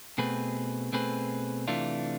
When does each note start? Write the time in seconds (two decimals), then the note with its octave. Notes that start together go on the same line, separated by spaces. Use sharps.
0.18 B2 A3 C4 G#4 B4
0.93 B2 A3 C4 G#4 B4
1.68 C3 E3 A3 D4 F4